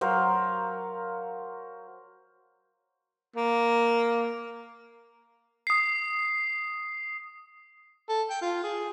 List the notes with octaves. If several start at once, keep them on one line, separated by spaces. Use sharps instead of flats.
F#3 A#4 C5 F5
A#3
D#6 C7
A4
G5
F4
G#4